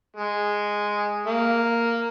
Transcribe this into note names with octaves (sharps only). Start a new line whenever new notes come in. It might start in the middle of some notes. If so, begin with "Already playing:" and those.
G#3
A#3